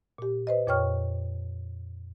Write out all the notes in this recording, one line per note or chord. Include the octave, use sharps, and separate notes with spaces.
A#2 G4
B4 C5 D#5
F2 A#2 C#5 G5 C#6 F6